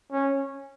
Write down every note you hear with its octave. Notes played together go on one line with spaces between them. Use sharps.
C#4